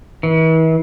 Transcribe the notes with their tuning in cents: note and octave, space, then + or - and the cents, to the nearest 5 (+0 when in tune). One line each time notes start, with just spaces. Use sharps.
E3 -40